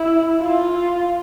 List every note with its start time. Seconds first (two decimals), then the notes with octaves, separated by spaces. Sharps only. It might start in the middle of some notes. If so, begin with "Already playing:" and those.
Already playing: E4
0.42 F4